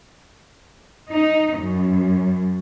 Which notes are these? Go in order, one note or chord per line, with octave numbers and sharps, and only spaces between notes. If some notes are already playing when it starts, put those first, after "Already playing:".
D#4
F#2